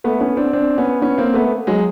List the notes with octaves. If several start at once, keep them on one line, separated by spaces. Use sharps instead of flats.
A3 B3
B3 C#4
C4 D4
C4 D4
B3 C#4
B3 C#4
A#3 C4
A3 B3
F#3 G#3